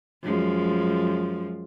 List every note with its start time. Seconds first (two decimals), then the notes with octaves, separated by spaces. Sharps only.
0.23 F#2 F3 G#3